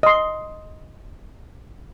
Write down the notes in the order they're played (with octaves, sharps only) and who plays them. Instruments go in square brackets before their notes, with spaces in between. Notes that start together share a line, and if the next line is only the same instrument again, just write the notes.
[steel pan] D#5 C6